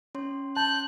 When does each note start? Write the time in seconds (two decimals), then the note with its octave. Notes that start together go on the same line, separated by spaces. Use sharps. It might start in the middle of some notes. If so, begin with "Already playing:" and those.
0.15 C#4 C#5 C6
0.57 A5 F#6 G6